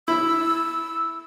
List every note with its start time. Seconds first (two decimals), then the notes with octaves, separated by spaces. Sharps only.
0.08 E4 E6